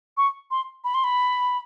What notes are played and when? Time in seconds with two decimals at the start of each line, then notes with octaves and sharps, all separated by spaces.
0.17 C#6
0.51 C6
0.84 B5
0.94 C6
1.04 B5